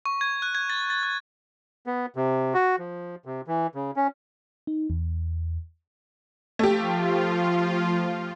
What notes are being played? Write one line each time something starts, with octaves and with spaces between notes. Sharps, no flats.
C#6
G#6
F#6
G#6
A6
A6
F#6
B3
C3
F#4
F3
C3
E3
C#3
C#4
D#4
E2
F3 A3 F4 G4